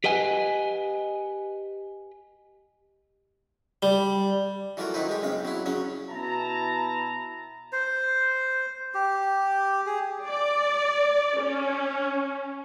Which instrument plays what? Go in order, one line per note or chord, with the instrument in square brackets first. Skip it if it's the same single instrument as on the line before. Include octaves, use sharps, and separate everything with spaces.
[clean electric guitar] G4 B4 D#5 F#5 G#5
[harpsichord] G3
E3 F#3 A3 F4 A#4
D#3 F#3 E4 B4 C5
G#3 G4
B1 C#3 C4 F5
F#3 E4
C#3 F#3 C#4
[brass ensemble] B2 E4 A5 A#5
[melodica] C5
G4
G#4
[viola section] D5
C#4